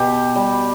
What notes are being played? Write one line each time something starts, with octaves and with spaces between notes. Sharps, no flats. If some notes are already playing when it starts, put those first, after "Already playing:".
Already playing: B2 G4
G3